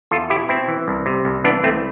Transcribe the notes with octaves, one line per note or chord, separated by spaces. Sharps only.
E2 F4 A4
B2 E4 G4
B2 C4 E4
E3
C2
C3
C2
E3 B3 D4
C2 A3 C4